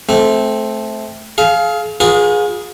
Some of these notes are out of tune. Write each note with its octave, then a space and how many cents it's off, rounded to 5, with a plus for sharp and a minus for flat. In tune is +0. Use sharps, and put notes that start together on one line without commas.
A3 -15 C4 +0
G#4 +40 F5 +0
F4 +40 G#4 +0 B4 -45